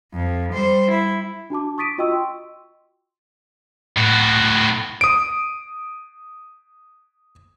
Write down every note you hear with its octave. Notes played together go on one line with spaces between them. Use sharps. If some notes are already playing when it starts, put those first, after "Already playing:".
F2
G3 C5
E4
D4 F#4 A5 D6
C#6 D#6 A6 B6 D7 D#7
F4 F#4 D#5 G5 C#6 E6
C6
A2 F#4
D#6 D7